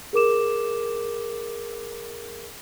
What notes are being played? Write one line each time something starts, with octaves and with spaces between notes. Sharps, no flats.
G#4 A#4 D6 E7